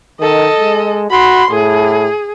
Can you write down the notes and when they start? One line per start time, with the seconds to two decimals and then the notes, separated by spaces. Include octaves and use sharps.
0.20 D#3 A4 D#5
0.59 G#3
1.10 F#4 B5 C6
1.51 A2 G#4